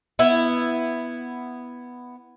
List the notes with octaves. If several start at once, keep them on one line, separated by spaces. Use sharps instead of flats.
B3 E4